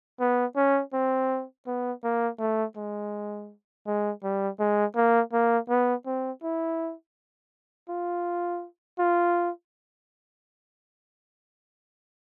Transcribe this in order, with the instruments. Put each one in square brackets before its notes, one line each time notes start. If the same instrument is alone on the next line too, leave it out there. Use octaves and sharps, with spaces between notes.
[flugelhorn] B3
C#4
C4
B3
A#3
A3
G#3
G#3
G3
G#3
A#3
A#3
B3
C4
E4
F4
F4